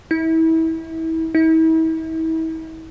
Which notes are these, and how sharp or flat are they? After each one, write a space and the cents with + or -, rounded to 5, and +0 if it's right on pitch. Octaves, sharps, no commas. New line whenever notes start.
E4 -30
E4 -40